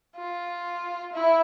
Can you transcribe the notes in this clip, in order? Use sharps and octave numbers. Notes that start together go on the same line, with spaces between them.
F4
E4